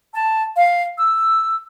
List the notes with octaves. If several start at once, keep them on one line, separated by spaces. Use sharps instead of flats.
A5
F5
E6